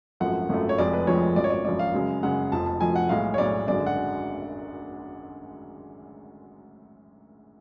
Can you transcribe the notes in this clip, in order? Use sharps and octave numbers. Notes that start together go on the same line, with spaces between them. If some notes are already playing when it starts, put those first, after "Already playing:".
G#1 F#2 F3 A3 F#5
G#1 F#2 F3 A3
C#5
F1 F2 F3 G#3 D5
B4
F1 F2 F3 G#3 C#5
G#1 F#2 F3 D5
C#5
D5
G#1 F#2 F3 D5
F5
F#2 C#3 G#3
F#2 C#3 G#3 F#5
F1 F2 F3 A5
A5
F1 F2 F3 G#5
F#5
B1 A2 G#3 F5
C#5
B1 A2 G#3 D5
G#1 F#2 D3 G#3 D5
F#5